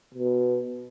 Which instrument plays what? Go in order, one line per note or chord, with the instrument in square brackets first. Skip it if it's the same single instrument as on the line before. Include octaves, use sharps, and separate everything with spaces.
[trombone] B2